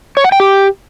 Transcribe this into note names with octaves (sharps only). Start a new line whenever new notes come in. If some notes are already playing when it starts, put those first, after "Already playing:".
C#5
F#5
G5
G4